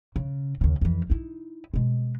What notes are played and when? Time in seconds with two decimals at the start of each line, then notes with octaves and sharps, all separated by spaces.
0.16 C#3
0.61 D#2 C#3
0.81 F2 E3
1.10 D#4 E4
1.74 B2 G#3